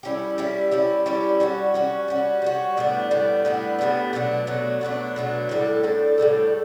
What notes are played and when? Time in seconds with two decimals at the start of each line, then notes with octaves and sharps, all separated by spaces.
0.03 G3 C#4 E4 G4
0.38 G3 C#4 E4 G4
0.72 G3 C#4 E4 G4
1.06 G3 C#4 E4 G4
1.40 G3 C#4 F#4
1.74 G3 C#4 F#4
2.08 G3 C#4 F#4
2.42 G3 C#4 F#4
2.77 A2 G3 B3 D4
3.11 A2 G3 B3 D4
3.45 A2 G3 B3 D4
3.79 A2 G3 B3 D4
4.13 B2 F#3 A3 D4
4.47 B2 F#3 A3 D4
4.81 B2 F#3 A3 D4
5.16 B2 F#3 A3 D4
5.49 A2 G3 D4 A4
5.83 A2 G3 D4 A4
6.18 A2 G3 D4 A4